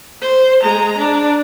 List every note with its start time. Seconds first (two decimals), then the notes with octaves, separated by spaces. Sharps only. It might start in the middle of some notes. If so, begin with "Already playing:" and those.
0.21 C5
0.62 G#3 A#5
0.98 D4